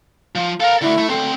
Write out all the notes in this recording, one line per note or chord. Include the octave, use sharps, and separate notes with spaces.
F3
A4 A#4 F5
D3 A3 E4
A3
D2 C4 A4